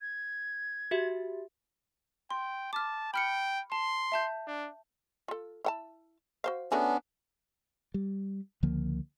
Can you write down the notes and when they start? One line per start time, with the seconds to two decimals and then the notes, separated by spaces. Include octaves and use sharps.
0.01 G#6
0.91 F#4 G4 E5
2.31 G5 C6
2.73 A5 D6 F6
3.14 G5 B5 F6 C#7
3.72 A5 C6
4.12 E5 A5 G6
4.47 D4
5.28 F4 A4
5.65 E4 F#5 A5
6.44 F#4 C5 F5
6.72 A3 B3 C#4 D4 F#4 G#4
7.94 G3
8.63 C#2 D3 F3 A#3